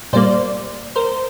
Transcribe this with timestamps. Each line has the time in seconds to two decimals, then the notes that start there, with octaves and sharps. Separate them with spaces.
0.13 A#2 G3 A#3 C5 D5
0.96 A#4 C5